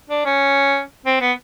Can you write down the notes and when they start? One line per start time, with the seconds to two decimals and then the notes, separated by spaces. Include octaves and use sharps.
0.10 D4
0.25 C#4
1.06 C4
1.21 B3